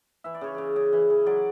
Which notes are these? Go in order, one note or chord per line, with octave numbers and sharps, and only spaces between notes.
E3 E5
D5
C#3 C#5
C#3 D5
C#3
E3
C#3
F#3 D5